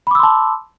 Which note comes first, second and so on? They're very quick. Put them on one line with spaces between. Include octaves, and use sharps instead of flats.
B5 D6 E6 C6 A5